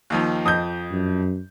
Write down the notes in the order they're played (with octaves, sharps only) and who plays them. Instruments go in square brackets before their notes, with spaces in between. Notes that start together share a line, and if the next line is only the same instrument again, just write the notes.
[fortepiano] D#2 D#3 F3
[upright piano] F2 D#5 G6 [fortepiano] D#6
[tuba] F#2